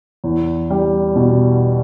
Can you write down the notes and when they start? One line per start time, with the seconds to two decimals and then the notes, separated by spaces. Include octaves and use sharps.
0.24 E2
0.70 G3
1.15 B2